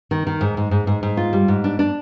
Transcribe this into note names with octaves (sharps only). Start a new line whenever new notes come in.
D#3
D#3
G#2
G#2
G#2
G#2
G#2
F4
G3
G#2
D4
D4